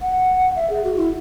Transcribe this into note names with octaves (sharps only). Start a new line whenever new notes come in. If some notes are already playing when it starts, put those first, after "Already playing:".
F#5
E5
G#4
F#4
E4